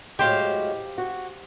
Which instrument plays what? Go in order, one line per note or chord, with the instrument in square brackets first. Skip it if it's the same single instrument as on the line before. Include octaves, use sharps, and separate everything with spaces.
[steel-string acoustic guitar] A2 F#3 G#3 [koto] G4 C5 F5
[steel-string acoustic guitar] F#4